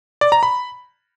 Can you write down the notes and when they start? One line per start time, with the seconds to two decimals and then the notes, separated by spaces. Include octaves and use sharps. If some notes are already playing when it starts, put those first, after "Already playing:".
0.21 D5
0.32 A#5
0.43 B5